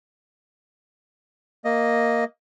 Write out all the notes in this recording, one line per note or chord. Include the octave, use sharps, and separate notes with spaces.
A#3 D#5